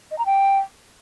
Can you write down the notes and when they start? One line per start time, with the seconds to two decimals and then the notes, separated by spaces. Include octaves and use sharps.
0.11 D#5
0.18 A#5
0.26 G5